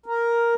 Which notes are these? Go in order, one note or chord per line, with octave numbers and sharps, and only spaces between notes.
A#4